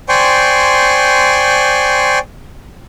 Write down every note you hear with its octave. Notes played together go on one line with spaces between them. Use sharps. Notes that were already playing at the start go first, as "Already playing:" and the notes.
C5 D5 G5 G#5 C6 C#6